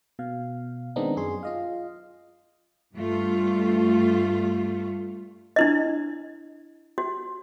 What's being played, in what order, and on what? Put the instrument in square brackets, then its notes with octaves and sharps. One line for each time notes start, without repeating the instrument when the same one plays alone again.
[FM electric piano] B2 F5
D#3 G#3 B3 C4 D4 D#4
F#2 G#4 C6
F4 D#5 F5
[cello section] G2 G3 A3 F4
[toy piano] D4 E4 D#5
F#4